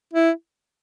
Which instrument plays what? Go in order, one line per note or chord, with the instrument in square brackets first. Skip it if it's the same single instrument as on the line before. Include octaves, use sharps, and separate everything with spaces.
[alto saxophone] E4